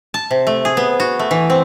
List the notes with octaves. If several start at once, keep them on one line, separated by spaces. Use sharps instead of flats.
A5
C3
A3
G#4
B3
F#4
A3
E3
C4